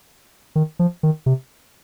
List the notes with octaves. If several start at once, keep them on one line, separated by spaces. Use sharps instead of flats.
D#3
F3
D#3
C3